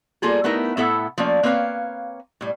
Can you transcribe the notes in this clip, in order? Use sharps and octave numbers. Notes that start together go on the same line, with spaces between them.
G3 A#3 F4 G#4 A4
A3 B3 D#4 E4 A#4
A2 B3 E4 A4 E5 F#5
F3 A3 A#3 C#4 D5
A#3 C4 D4 B4 C#5 F5
A2 G3